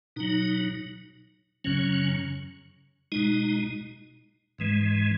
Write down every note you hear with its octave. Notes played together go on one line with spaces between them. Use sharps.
B2 F#3 D#4
F#2 C#3 F#3 C#4
B2 G#3 D#4
G#2 E3 G#3